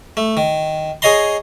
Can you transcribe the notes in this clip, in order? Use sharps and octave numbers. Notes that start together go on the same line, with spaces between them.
A3
D#3
G#4 C#5 D#5 A#5 C6